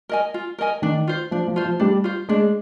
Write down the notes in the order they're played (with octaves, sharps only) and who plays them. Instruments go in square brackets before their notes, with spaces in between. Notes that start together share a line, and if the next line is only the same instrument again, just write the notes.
[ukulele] A#4 D#5 G#5
F4
A#4 D#5 G#5
[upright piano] D#3 [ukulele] D4
[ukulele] F4 C5
[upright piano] F3 [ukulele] D4
[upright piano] F3
[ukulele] F4 C5
[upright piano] F3
[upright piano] G3 [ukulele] D4
[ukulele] F4 C5
[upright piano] G#3 [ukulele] D4